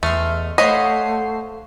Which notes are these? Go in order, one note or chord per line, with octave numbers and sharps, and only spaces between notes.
E2 A3 D#5 E5 C6 F6
A3 C5 C#5 D#5 F5 F#5 B5 C7